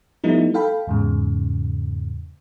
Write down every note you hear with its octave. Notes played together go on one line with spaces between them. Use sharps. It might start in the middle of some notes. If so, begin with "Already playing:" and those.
F3 G3 A3 B3 D#4 E4
A4 F5 G5 B5
E2 G#2 C#3